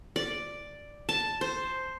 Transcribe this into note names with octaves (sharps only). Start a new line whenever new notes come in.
D5
A5
C5